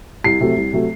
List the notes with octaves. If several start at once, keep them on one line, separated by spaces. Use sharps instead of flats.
C2 C7
C3 F#3 A3
C2
C3 F#3 A3